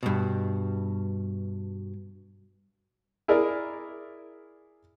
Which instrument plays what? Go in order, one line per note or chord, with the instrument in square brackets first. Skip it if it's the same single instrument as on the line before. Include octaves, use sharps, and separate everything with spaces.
[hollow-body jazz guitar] G2 B2
[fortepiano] E4 G#4 A#4 D5